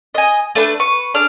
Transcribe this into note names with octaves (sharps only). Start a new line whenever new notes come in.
D#5 G#5
A3 D4 B4
B4 C#6
D4 G#4 F6